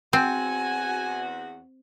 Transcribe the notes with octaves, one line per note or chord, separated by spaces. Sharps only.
E2 C4 F#4 G#5